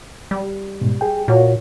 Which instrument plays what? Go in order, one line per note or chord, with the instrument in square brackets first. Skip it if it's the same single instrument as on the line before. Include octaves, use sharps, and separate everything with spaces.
[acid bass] G3
[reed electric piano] G#2 B2
G#4 G5
[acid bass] A#2 [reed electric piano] F4 F#4 C#5